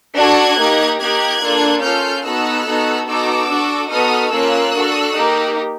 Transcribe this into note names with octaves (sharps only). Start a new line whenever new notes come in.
D4 F#4 A4 F#6 G#6
A#3 D#4 G4
A#3 D#4 G4 F#6 G#6
A#3 D4 F4 A4
C#4 F4 A4 F6 G6
B3 D#4 F#4 A4 E6 F#6
B3 D#4 F#4 A4
B3 D#4 F#4 A4 D6 E6
D4 F#4 A4
B3 D#4 F#4 A4 D#6 F6
A#3 C#4 F4 E6 F#6
D4 F#4 A4
A#3 D#4 G4